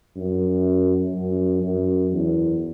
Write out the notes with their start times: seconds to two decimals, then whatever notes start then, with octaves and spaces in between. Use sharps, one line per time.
0.17 F#2
1.15 F#2
1.63 F#2
2.13 E2